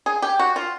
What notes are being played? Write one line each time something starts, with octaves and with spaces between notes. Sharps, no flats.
G#4
G4
F#4
F4